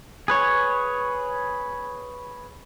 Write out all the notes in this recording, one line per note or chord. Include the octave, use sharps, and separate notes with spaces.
G#4 B4 C#5